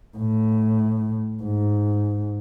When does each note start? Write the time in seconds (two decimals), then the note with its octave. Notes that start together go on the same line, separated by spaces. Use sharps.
0.18 A2
1.43 G#2